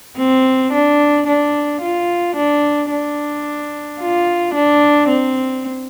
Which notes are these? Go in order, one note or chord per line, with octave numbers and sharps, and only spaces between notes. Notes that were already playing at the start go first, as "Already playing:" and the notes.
C4
D4
D4
F4
D4
D4
F4
D4
C4